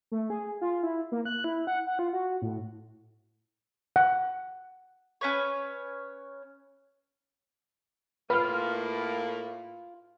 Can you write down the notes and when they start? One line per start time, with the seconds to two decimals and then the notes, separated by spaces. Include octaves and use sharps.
0.12 A3
0.30 G#4
0.61 F4
0.83 E4
1.12 A#3
1.25 F#6
1.44 E4
1.67 F#5
1.87 F#5
1.99 F4
2.13 F#4
2.42 A2
3.96 F#5
5.21 C#4 B4 C#5
8.30 A2 A#3 F4 B4 B5 F6